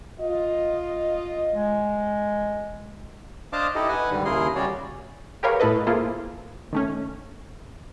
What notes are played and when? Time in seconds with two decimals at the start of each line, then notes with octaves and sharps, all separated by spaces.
0.19 F4 D#5
1.54 G#3
3.53 D4 C5 D#5 F5 A5 D6
3.75 D#4 E4 G4 A4 D#5
3.89 B4 F#5 G#5
4.11 G#2 D3 D#3 G3
4.25 D#2 C#3 E4 G#4 A#4 C6
4.55 C#3 G3 C#4 F#4 C#5 D5
5.43 G4 G#4 A#4 B4 C#5 F5
5.60 A2 E4 A4 B4 D#5
5.87 A#3 E4 F4 G#4 A4 C5
6.73 D#3 A3 C#4